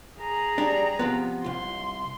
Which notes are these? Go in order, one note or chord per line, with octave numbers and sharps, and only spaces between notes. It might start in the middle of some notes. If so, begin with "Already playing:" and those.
G#4 A#5
G3 D4
C3 F3 B3
C2 F4 C6